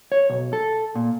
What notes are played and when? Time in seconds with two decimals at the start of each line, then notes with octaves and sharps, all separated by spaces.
0.12 C#5
0.29 B1
0.53 A4
0.95 A#2